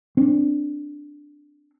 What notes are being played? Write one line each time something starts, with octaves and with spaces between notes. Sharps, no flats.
C4 D4